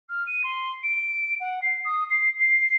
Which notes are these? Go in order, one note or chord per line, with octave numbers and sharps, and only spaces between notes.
F6
D#7
C6
D7
F#5
C7
D#6
C7
C7